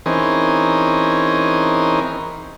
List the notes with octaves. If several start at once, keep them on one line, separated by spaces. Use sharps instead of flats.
E3 C4 C#4 D#4 G#4 A#4